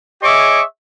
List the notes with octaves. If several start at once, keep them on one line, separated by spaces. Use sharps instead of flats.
G#4 C#5 D#5 E5 C#6 D6